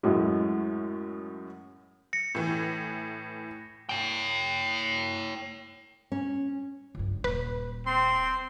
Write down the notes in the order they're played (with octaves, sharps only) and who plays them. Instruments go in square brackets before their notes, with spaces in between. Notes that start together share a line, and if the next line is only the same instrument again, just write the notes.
[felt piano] F#2 A2 F#3 G#3
[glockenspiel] A#6 C#7
[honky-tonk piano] A2 E3
[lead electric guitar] C#5 G5
[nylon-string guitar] C#4
[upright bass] C#2 G2
[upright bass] D#1 [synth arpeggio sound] B4
[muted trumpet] C4 [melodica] C6